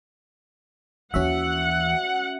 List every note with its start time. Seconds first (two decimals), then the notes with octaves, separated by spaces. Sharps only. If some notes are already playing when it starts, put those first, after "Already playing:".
1.14 D#2 E3 C#4 F#4 E5 F#5